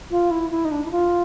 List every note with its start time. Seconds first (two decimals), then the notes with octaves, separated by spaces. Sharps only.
0.11 F4
0.31 E4
0.51 E4
0.65 D#4
0.72 D4
0.85 E4
0.91 F4